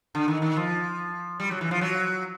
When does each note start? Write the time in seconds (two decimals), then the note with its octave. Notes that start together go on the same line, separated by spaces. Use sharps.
0.15 D3
0.28 D#3
0.42 D#3
0.57 F3
1.40 G3
1.51 F#3
1.61 E3
1.71 F3
1.81 F#3